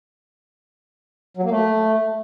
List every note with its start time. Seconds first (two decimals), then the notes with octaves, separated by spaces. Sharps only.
1.37 F#3
1.44 A#3
1.51 A3